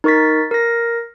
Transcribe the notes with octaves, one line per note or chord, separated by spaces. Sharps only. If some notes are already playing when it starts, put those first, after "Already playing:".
D#4 A#4 C#6 A6 B6
A#4 A#6